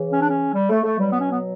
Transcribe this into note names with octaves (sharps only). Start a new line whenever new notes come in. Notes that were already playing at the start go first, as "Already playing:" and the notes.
Already playing: C#3 E3
C#4
D4
C#4
G3
A3
A3
B2 F#3 G3
B3
C#4
B3